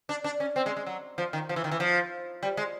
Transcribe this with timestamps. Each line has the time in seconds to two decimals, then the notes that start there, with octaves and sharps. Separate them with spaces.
0.09 D4
0.24 D4
0.40 C#4
0.56 C4
0.66 G#3
0.76 G#3
0.87 F#3
1.18 F3
1.33 D#3
1.49 F3
1.56 E3
1.64 D#3
1.71 E3
1.80 F3
2.43 G3
2.57 G#3